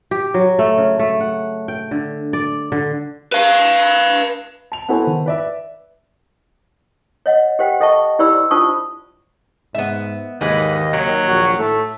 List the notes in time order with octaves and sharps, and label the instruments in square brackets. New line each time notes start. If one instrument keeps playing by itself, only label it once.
[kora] G4
F#3
A3
C#3
A3
F#5
G5
D3
D5
D3
[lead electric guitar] B4 F5
[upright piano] A5 F7
B3 E4 F#4 A4 C5 G#5
D#3
B4 D5 E5
[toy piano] C#5 D#5 F#5
G4 C5 F#5 G5
A4 D#5 E5 A5 C#6
E4 G4 C5 D5 B5 E6
D4 F4 C5 A5 C#6 D#6
[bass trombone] G#2 [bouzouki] B3 E5
[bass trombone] D#2 [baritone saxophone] G#2 [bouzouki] E3 B4 F#5 [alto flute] D#5
[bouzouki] D#3 [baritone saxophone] F#3
[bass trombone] A#1 [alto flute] F#4
[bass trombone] A2 [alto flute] A3